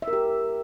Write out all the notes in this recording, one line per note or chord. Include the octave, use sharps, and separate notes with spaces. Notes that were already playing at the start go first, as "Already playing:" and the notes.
E5
A#4
G4